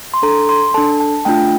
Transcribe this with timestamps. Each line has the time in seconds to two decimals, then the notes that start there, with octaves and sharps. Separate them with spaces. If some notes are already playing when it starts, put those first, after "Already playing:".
0.14 C6
0.22 D4 A4 A#5
0.49 C6
0.74 D4 A4 A5
1.00 A5
1.25 A3 D4 F4 G5